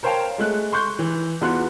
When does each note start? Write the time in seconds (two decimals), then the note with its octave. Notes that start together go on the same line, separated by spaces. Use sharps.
0.03 A#4 C5 C#5 F5 G5 A5
0.38 G#3 A3 F#6
0.72 C6 C#6 F#6 G6
0.99 E3
1.41 E2 B3 F4 F#4 C6 F#6